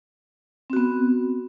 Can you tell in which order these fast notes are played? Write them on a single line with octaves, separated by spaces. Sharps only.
C4 F#4 B3